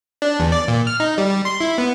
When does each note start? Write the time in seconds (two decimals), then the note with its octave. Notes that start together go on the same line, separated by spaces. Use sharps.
0.22 D4
0.40 E2
0.52 D5
0.68 A#2
0.87 F6
1.00 D#4
1.18 G3
1.31 G3
1.45 C6
1.61 E4
1.78 B3